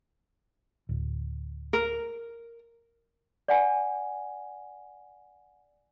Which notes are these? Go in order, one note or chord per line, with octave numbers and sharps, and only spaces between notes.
D1
A#4
D5 F#5 G#5